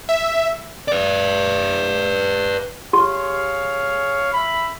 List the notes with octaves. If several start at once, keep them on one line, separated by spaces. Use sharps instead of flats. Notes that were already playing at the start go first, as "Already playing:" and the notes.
E5
B4 D5
G4 G#4 C#5 F5 C6
E5 B5